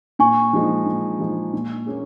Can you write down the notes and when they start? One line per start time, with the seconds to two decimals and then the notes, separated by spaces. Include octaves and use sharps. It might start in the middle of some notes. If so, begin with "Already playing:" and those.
0.19 A#2 G#5 C#6
0.53 F3 G#3 D#4
0.86 A#2
1.19 F3 G#3 D#4
1.53 A#2
1.86 A#3 C#4 G#4